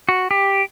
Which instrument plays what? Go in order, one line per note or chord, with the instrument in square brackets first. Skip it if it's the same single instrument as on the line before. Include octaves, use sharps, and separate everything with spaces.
[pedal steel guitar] F#4
G4